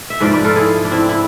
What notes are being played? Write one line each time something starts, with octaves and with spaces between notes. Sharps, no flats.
E5
G#2 F3 B4 D5
B4 D5
F4 A4
E4 G#4
D4
C4 E4
E4